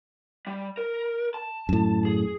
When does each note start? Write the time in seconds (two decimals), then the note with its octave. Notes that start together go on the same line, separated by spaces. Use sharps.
0.47 G3
0.77 A#4
1.34 A5
1.69 F#2 A2
2.05 G#4